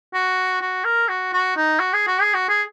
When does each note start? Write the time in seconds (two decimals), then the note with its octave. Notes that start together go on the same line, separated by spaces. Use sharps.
0.14 F#4
0.62 F#4
0.84 A#4
1.09 F#4
1.33 F#4
1.56 D#4
1.80 F#4
1.93 G#4
2.07 F#4
2.21 G#4
2.34 F#4
2.49 G#4